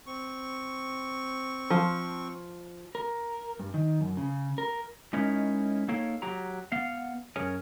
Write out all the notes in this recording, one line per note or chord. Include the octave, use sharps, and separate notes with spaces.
C4 C#6
F3
A#4
G2
D#3
F#2
C#3
A#4
G#3 C#4 D#4 E4 A#4 C#5
A#3 D#4 A4 C#5 F5 G5
F#3 G4 G5 A#5
B3 F5 F#5
F#2 C#4 G#4 A#4 C#5 G#5